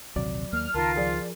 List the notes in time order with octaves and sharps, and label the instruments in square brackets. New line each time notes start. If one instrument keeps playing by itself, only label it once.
[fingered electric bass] A#1 D#2 C3 [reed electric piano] F#3 D5
[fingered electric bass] D#2 A#3 [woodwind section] F6
[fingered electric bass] C#2 D#3 [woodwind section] F4 [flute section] A#4 A5
[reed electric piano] F3 G#4 A#4 [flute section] D5